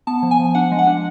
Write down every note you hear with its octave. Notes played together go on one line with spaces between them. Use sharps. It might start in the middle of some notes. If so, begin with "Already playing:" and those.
B3 A5
F3
G#5
F3
D4 F#5
G#3
F#5
D4